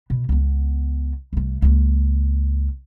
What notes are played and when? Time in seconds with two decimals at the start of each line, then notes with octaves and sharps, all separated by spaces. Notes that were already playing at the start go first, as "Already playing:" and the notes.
0.10 B2
0.29 C#2 B3
1.33 C2 A3
1.62 C#2 A#3